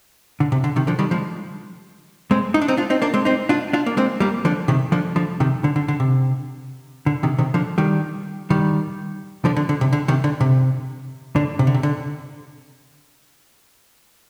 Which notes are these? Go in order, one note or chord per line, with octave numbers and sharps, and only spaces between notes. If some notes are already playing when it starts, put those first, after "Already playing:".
D3
C3
D3
C3 D#3
D3 F3
D#3 G3
F3 G#3
G#3 C4
D#4
D4
C4 D#4
D4 F4
C4 D#4
A#3 D4
G#3 C4
C4 D#4
D4 F4
D4 F4
A#3
G#3 C4
G3 A#3
D3 F3
C3 D#3
D3 F3
D3 F3
C3 D#3
D3
D3
D3
C3
D3
C3 D#3
C3 D#3
D3 F3
D#3 G3
D#3 G3
D3 F3
D3
D3
C3
D3
C3 D#3
D3
C3
D3
C3
D3
C3
D3